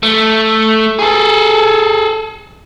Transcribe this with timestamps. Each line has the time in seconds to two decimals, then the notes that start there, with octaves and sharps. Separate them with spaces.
0.03 A3
0.99 G#4 A4